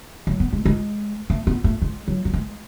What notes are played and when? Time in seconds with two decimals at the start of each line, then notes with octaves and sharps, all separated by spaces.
0.27 F#3
0.40 B3
0.53 G#3
0.65 G#3
1.30 A3
1.47 B3
1.64 A3
1.82 G#3
2.08 F#3
2.25 F#3
2.34 G#3